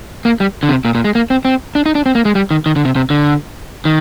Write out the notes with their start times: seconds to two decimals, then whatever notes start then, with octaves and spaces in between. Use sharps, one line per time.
0.25 A#3
0.40 G3
0.63 D3
0.69 C3
0.85 A#2
0.95 A#2
1.04 G#3
1.15 A#3
1.30 C4
1.45 C4
1.75 D4
1.86 D#4
1.95 D4
2.06 C4
2.15 A#3
2.25 G#3
2.35 G3
2.51 D#3
2.66 D#3
2.76 D3
2.85 C3
2.96 C3
3.10 D3
3.85 D#3